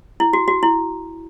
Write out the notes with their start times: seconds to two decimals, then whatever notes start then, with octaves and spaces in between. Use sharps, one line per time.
0.20 E4
0.33 F#4
0.48 F#4
0.63 E4